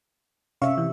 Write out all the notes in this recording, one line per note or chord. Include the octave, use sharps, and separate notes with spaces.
C3 C#4 E5 F5 C#6
E3